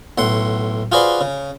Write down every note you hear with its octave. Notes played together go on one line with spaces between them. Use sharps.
B1 A2 F#5 C6
F4 F#4 G#4 B4 C5 D5
C#3